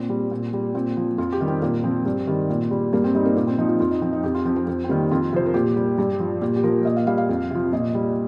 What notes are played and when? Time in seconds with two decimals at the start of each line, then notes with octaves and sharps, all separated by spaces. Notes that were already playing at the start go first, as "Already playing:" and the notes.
Already playing: A#2 C4
0.09 G3
0.31 A#2
0.53 G3
0.74 A#2 C4
0.97 F3
1.18 F2 F4
1.32 G4
1.41 D#3 G3
1.48 C4
1.62 A#2 A#3
1.84 F3 C4
2.06 G2
2.27 D#3 G3
2.50 A#2
2.71 G3
2.93 G2 A#3
3.04 C4
3.15 G3 D#4
3.25 A#3
3.36 A#2 A#3
3.47 C4
3.58 F3 D#4
3.69 F4
3.80 F2 F4
3.91 D#4
4.02 F3 C4
4.13 D#4
4.24 F2 G4
4.35 F4
4.45 F3 C4
4.56 C4
4.67 F2 C4
4.84 C4
4.89 D#3 G3 A#3
5.11 F2 F4
5.33 C3 F3 C5
5.46 A#4
5.54 A#2 G4
5.76 G3
5.98 G2
6.20 F3
6.41 A#2 G4
6.56 G4
6.63 F3 A#4
6.85 A#2 D#5
6.96 F5
7.07 G3 F5
7.18 F5
7.29 F2
7.51 C3 F3
7.73 A#2 D#5
7.94 G3